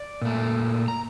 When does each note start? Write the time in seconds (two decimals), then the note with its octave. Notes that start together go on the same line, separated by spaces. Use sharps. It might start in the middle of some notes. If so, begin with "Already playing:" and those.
Already playing: D5
0.22 A#2 A3
0.88 A#5